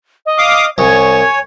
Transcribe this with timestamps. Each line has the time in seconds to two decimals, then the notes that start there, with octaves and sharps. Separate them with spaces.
0.26 D#5
0.38 F5 D6 D#6
0.78 C2 C#5 G#5